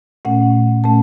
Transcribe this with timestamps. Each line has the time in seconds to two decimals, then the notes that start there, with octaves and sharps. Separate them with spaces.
0.25 A#2 A3 C#4 F#5
0.84 A#2 A3 C#4 A5